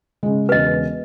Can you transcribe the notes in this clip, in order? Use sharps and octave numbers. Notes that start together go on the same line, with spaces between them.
C#3 G#3
E1 C#3 B4 D#5